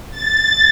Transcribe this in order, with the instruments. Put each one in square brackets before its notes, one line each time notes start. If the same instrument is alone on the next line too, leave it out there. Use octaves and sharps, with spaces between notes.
[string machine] A6